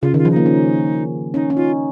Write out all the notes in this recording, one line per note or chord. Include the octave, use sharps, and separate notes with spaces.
C#3 F4
D#3
F4
F3
D#4
A#3
C#4
C#4 D#4
C#4
D#4 F4